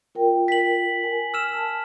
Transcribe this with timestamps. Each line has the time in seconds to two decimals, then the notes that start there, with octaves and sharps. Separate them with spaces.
0.15 F4 A#4 G5
0.48 B6 F#7
1.03 A#4 G#5
1.34 E6 F6 E7
1.54 A5